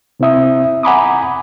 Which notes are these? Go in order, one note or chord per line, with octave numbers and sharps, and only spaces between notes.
C3 C4 E4 E5 D#6
F#5 G#5 A#5 B5 D6 D#6